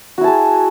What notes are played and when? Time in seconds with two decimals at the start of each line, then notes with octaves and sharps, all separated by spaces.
0.18 F#4
0.21 E4
0.24 A5
0.27 G#4